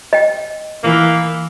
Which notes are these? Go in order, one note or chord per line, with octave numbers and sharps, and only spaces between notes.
D#5 G5
E3 A#3